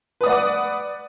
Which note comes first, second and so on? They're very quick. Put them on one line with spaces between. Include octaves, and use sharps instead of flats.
B4 D#6 D5 F#5 D6